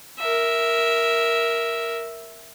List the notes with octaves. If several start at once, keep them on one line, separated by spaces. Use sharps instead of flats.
A#4 E5